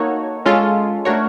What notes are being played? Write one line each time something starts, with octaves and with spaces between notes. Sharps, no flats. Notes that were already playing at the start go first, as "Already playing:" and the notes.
Already playing: A#3 D#4 F#4 A4 C#5
G#3 C#4 F4 A4
A3 D4 F#4 A#4 C#5